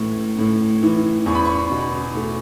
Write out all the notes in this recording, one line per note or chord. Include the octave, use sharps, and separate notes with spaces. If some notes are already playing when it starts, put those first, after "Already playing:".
Already playing: A2 E3
A2
E3
E2 C#6
B5
C#6
B2
A3